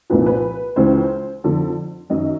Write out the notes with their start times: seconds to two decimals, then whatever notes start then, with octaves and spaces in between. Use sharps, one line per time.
0.10 C2 A#2 F3 B4
0.26 B4
0.76 C#2 C#3 E3 C5
1.44 F2 D3 F3
2.10 F#2 D#3 F#3 D#5